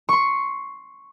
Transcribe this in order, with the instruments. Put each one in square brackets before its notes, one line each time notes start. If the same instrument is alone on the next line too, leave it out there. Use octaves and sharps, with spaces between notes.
[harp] C6 C#6